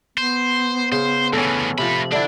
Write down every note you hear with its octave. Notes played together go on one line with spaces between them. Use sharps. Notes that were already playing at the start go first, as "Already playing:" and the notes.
B3 C5
C#3 C5
D2 E3 C#4 A4
C3 F3 A3 B5
D3 D4 E4